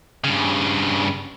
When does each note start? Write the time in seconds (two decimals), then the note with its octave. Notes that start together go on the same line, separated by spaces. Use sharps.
0.24 G2 C#3